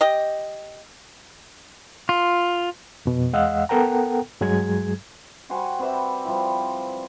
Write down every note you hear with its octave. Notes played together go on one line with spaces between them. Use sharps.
G4 D#5
F4
F2 B2
E2 G#3 D#5 F5 F#5 E6
B3 A4 A#4 F#5 G5 A#5
G2 F#3 G#3 G#4 G#6
G3 F#4 C5 G#5
C4 B4 D5 E5
F3 G3 E4